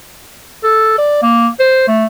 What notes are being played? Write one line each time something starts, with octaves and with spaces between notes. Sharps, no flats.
A4
D5
A#3
C5
A3